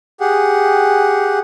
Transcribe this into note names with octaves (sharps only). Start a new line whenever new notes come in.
G4 G#4 F#5